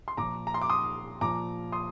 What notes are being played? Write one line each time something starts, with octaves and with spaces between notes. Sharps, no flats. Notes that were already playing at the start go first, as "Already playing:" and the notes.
C6
A#2 F3 A#5 D6
A#5
C6
D6
C6 D#6
A#2 F3 A#5 D6
C6 D#6